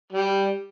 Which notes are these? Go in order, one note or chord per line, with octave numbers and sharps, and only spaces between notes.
G3